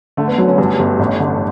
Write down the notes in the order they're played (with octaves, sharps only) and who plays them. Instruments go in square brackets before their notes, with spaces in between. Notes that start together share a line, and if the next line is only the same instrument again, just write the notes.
[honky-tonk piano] D3 [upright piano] A3
[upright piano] B3
[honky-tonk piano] F#3 [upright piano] C#4
[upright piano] C#4
[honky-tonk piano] G2 [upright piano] C#4
[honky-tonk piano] G1
A1
D3